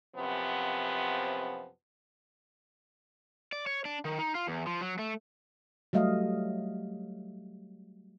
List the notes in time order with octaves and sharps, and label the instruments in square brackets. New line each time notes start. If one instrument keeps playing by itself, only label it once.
[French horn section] F#2 C3 F3 B3
[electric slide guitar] D5
C#5
D4
D#3
D#4
F4
E2
F3
F#3
A3
[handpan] F#3 G3 A3 D#5 F5